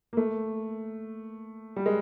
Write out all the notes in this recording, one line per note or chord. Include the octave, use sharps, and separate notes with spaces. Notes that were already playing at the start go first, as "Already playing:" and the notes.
A#3
A3
G3
G#3